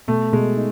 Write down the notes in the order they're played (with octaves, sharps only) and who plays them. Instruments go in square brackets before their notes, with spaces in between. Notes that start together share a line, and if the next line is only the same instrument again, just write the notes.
[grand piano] B2 [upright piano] A3
[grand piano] B2 [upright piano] G#3
[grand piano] D#4